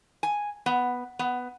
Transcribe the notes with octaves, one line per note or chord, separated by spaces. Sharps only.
G#5
B3
B3